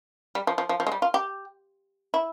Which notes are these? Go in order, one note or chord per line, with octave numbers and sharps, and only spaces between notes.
G3
F3
F3
F3
F3
G#3
G3
F4
G4
E4